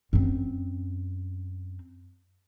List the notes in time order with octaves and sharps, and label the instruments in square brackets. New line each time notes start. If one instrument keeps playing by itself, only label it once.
[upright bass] F#2 C4